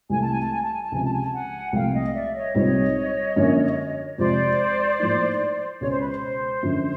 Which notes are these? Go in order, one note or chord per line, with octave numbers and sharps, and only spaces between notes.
C2 C3 E3 A3 G#5
A5
G#5
A5
G#5
A5
G#5
A5
C#2 C3 F3 G#5
A5
G#5
A5
F#5 G#5
C2 A#2 F3 A3 F5 G5
D#5 F5
D5 E5
C#5 D#5
C2 A#2 G3 C4 D#4 C#5 D#5
F#2 D3 F3 A#3 C#4
F2 C3 F3 G#3 C5 D5
A2 F3 A#3 D#4
C#2 B2 G#3 C#4 C#5
C5
B4
C5
F#2 D3 F3